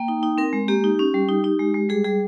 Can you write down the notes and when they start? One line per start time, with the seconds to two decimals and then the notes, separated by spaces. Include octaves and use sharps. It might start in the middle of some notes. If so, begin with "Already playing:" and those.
Already playing: A#3 G5
0.08 D#4
0.23 D#4
0.38 C4 A#4
0.53 G#3
0.68 A#3 G4
0.84 D#4
0.99 C#4
1.14 G3
1.29 D#4
1.44 D#4
1.60 G#3
1.74 G#3
1.89 G3 G#4
2.04 G3 G#4